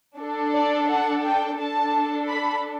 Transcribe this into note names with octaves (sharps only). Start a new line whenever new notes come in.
D4 A4
D5
F#5
G5
D4 A4 A5
B5